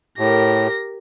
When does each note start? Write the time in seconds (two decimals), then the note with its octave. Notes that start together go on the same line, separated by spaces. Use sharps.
0.19 A2 G4 A#4 A#6